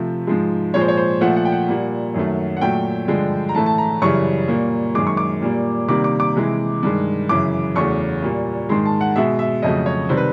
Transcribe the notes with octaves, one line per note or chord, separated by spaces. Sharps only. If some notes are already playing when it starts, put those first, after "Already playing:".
Already playing: C3 F3 A3
G#2 F3 G#3
A#2 F3 G#3 C#5
C5
C#5
C5
A#2 F3 A3 F#5
F#5
G5
F#5
A#2 G3 A#3
F#2 D#3 F#3 A3
F#5
A#2 F#3 A3 G5
G2 D3 F3 G#3
A#5
A2 E3 A3 A5
A5
A#5
F#2 C#3 E3 G3 C#6
A#2 G3 A#3
F#2 D#3 G#3 D6
C#6
D6
A#2 G3 A#3
C3 D#3 G3 A#3 D6
D6
D6
C3 E3 G#3
G2 D#3 G#3
F#2 C#3 E3 D6
E2 C#3 F#3 A3 C#6
A#2 G3 A#3
G#2 D#3 G#3 C6
A5
F#5
B2 G#3 E5
E5
F2 C#3 F#3 A3 D#5
C#5
C3 D#3 G3 C5
B4